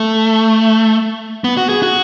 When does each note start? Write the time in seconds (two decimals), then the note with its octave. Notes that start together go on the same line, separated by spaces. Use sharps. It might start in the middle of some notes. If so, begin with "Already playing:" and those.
Already playing: A3
1.44 B3
1.57 F#4
1.69 G#4
1.83 F#4